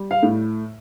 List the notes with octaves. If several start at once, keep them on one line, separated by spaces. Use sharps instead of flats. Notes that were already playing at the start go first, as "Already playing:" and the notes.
Already playing: G3
F5
A2